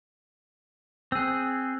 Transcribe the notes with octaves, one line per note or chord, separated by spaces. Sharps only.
C4 G#4 E6 F#6